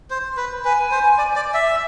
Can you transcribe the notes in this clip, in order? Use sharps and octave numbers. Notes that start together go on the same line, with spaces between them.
C5
B4
B4 G#5
C5
D5
D5
E5